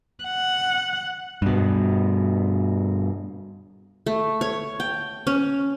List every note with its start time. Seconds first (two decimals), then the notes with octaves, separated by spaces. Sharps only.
0.24 F#5
1.42 G2 B2
4.06 A3
4.41 C#5
4.80 G5
5.27 C#4